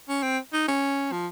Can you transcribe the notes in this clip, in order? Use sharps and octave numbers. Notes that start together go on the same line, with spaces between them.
C#4
C4
D#4
C#4
F3